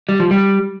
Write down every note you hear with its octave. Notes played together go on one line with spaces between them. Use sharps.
G3
F3
G3